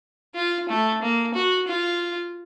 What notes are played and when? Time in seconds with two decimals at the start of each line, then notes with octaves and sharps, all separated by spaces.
0.35 F4
0.69 A3
1.02 A#3
1.34 F#4
1.68 F4